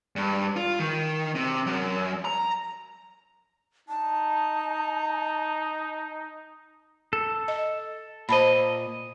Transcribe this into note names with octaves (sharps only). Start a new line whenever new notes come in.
G2
F4
D#3
C3
F#2
A#5
D#4 A5
A4
D#5
A#2 C5 D#5 A5 B5